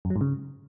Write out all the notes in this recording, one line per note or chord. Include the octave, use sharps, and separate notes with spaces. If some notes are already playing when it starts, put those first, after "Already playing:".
F#2
F#3
G#2
C#3